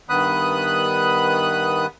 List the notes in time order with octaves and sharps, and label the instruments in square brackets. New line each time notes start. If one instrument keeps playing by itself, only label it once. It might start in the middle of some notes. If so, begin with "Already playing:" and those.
[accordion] G2 D#3 B3 B5 D#6 F#6